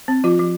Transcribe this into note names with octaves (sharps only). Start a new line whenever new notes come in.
C4
F3 F4
F3